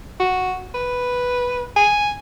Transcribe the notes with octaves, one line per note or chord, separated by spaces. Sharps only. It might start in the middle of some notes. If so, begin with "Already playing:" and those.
F#4
B4
G#5